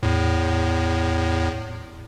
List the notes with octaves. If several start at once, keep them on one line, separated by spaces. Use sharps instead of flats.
E2 A2